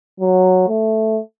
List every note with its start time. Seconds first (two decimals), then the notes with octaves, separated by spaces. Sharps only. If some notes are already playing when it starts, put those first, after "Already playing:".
0.20 F#3
0.69 A3